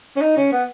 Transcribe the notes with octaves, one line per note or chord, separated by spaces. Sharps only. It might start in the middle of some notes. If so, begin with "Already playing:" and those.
C#4
D#4
C#4
B3